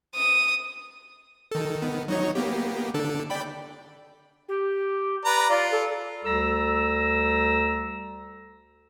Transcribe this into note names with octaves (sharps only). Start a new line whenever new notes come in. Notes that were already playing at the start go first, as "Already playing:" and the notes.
D#6
D#3 A4
D#3 B3
F#3 D#4 C#5
A#3 B3 G4
D3 D4 A4
D5 G5 B5
G4
B4 D5 A#5
F4 D5
A4
D2 G3 A4 A#5 E6